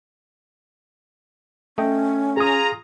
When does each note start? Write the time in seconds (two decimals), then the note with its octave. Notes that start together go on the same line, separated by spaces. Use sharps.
1.78 A3 C#4 D#5 G5
2.37 F4 G#4 G#5 A#5 D#6